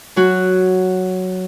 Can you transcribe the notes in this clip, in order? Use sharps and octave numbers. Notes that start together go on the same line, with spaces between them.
F#3 F#4